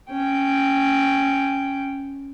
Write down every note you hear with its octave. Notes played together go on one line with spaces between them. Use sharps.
C#4 G5